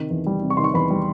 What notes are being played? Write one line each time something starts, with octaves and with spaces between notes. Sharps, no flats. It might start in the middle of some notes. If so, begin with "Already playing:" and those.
Already playing: C3 D#3
E2
G3
C3
C#6
D#3 C6
C#6
E2 B5
G3